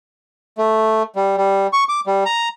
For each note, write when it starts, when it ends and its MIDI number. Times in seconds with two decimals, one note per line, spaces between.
0.58 1.03 57
1.16 1.37 55
1.37 1.67 55
1.73 1.84 85
1.89 2.00 86
2.07 2.24 55
2.26 2.49 82